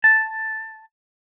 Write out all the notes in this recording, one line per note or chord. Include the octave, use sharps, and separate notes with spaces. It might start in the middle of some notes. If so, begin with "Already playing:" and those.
A5